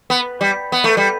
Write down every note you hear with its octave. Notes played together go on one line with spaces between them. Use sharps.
B3
G3
B3
A3
G3